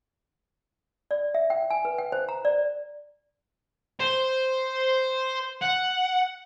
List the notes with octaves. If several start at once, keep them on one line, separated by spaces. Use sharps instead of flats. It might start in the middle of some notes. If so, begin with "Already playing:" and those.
D5
E5
G5
G#5
B4
G5
C5
A#5
D5
C5
F#5